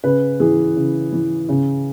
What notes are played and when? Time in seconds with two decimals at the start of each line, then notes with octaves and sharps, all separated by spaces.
0.03 C#3 B4
0.40 E3 G#4
0.76 C#3
1.13 E3
1.49 C#3